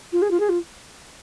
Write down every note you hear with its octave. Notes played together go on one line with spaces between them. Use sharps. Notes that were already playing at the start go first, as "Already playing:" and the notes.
F4
G#4
F4
G#4
F4